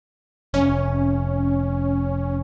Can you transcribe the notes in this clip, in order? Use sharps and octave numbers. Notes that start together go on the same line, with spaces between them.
F1 C#4